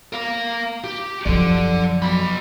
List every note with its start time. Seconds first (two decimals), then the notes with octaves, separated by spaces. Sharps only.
0.13 A#4 F5
0.84 G4
1.26 F#2 F3 A4 D5
2.02 F#3 B5